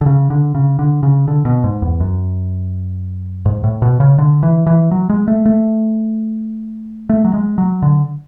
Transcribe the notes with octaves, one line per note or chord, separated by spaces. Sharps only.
D3
C#3
D3
C#3
D3
C#3
D3
B2
G#2
E2
F#2
G#2
A2
B2
C#3
D3
E3
E3
F#3
G#3
A3
A3
A3
F#3
G#3
F#3
D3